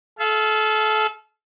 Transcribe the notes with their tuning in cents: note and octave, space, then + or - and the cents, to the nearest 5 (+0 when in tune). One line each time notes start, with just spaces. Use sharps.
A4 -30 F5 -25